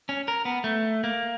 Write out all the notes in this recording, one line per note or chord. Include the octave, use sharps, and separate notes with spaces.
C#4
A#4
B3
A3
A#3